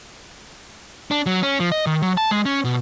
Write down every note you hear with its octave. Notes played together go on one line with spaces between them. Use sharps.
D4
F#3
C#4
F3
D#5
D#3
F#3
A5
G#3
C#4
B2